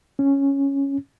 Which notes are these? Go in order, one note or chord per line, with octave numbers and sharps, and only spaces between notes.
C#4